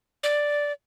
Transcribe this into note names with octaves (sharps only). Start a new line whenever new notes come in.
D5